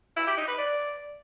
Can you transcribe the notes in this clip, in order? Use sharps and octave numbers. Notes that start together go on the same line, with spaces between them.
E4
G4
D#4
B4
D5